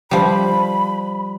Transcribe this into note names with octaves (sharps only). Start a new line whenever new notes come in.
F3 G3 B5